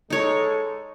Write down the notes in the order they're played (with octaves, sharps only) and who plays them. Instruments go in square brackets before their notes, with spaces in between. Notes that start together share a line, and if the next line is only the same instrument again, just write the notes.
[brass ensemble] G#3 A4 [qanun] D#4 C#5